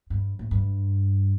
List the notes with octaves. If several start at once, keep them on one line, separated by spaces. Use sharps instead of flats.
G2
A2
G2